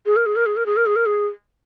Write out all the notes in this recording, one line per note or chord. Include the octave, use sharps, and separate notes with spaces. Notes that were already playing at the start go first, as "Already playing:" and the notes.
G#4
A#4
G#4
A#4
G#4
A#4
G#4
A#4
G#4
A#4
G#4